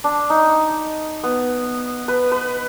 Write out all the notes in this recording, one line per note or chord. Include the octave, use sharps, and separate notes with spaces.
D4
D#4
B3
B4
B4